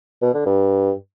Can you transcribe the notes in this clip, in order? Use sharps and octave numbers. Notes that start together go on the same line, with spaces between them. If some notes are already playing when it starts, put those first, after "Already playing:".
B2
D3
G2